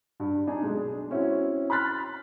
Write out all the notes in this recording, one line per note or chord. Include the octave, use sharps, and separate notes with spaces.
G2
D4 D#4 G#5
B1 G#3
C4 C#4 E4 F#4
B5 C6 F6 F#6 A6 B6